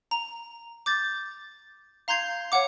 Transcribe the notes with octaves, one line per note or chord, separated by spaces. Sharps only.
A#5
D6 G6 A6
F5 A#5 C6 G6 G#6 C7
C#5 F5 F#5 D6